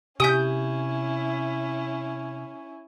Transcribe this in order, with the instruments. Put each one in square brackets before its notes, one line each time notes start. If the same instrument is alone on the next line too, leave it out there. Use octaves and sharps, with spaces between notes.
[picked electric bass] C3 [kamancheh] C#4 E4 [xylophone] G4 G#5 B6 [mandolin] D#6 G6